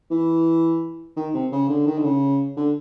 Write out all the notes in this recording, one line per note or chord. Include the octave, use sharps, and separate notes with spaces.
E3
D#3
C3
C#3
D3
D#3
D3
C#3
D3